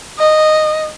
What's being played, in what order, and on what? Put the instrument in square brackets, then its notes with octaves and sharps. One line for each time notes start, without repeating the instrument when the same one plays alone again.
[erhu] D#5